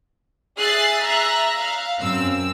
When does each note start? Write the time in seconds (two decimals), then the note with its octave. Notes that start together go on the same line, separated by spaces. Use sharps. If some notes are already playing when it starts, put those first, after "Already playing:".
0.58 G#4 E5 F#6 A6 C7
1.03 E5 A#5 F#6
1.57 F5
1.99 F#2 C4 E6